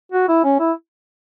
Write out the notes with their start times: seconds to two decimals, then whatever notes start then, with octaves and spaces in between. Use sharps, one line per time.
0.12 F#4
0.28 E4
0.44 C#4
0.60 E4